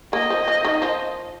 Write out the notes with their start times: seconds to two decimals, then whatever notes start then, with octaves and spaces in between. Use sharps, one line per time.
0.13 A#3 D#5
0.30 F3
0.48 F3
0.65 D#3
0.82 F3